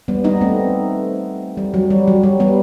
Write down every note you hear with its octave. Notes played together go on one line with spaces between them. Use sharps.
G3 B3
B3 D#4
A3 C4
G3
F#3
G3
F#3
G3
G3 B3